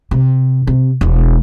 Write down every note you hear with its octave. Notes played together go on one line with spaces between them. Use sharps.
C3
C3
E1